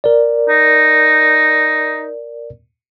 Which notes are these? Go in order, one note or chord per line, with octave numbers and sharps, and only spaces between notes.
A#4 D5
D#4